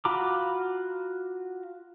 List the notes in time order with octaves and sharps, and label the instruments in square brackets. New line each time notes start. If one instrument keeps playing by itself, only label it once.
[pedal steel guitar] F4 F#4 A#5 B5 D6